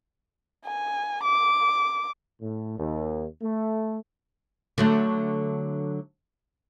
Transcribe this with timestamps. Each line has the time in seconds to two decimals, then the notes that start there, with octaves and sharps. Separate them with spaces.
0.65 G#5
1.23 D6
2.41 A2
2.78 D#2
3.42 A3
4.78 D3 F#3 A3